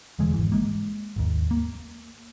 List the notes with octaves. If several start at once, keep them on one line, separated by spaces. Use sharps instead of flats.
E1 D3 E3 G#3
G#1 E3
G#3 A#3
G#1 D#2
A#3